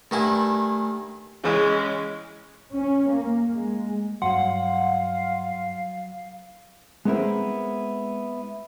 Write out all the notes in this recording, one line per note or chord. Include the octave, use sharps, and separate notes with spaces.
G2 D#3 A3 E4 G#5
C#3 E3 G#3 C#4
C#4
A#3
G#3
G2 F#3 F5 F#5 C6
G#3 B3 C4 E4 A#4 C5